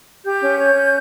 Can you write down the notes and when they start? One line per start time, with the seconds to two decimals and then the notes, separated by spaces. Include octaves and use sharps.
0.24 G4 G6
0.40 C#4
0.57 C#5
0.75 C#4